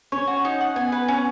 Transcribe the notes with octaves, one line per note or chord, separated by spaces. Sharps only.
C#4 C#5
F#4
D#4
F#5
B3 G#5
B4
C#4